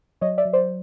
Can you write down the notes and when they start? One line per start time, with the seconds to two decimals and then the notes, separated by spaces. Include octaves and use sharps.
0.21 F#3 C#5 D#5
0.38 D5 E5
0.45 F#3
0.53 C5 D5